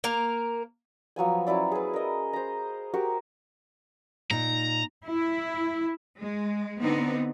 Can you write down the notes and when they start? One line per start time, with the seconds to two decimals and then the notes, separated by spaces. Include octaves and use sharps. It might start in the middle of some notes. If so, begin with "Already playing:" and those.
0.04 A#3 A#4
1.16 F3 F#3 B3 G#5
1.47 F#3 C#4 E4 D5
1.72 G#4 B4
1.94 A#4 D#5
2.33 C5 A#5
2.94 F#4 G4 A#4
4.31 A#2 D#4 A#5
5.04 E4
6.19 G#3
6.79 D3 B3 C4 D4 D#4